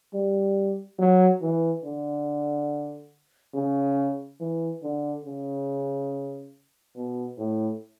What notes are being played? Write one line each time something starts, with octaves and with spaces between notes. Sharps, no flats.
G3
F#3
E3
D3
C#3
E3
D3
C#3
B2
A2